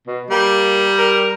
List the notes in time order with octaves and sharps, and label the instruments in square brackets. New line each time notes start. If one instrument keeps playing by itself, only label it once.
[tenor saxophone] B2
[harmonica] G3 [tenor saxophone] A#3
[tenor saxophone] A#4